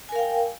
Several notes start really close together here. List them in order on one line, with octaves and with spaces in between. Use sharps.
G#5 A#4 F5 G5